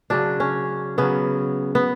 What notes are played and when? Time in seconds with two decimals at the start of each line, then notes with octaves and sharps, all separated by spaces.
0.10 C#3 F#3 D4
0.40 C#4
0.98 C#3 F#3 B3
1.75 B3